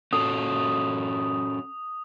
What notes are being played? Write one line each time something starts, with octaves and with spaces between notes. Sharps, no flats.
C#4 F#4 A4 D#6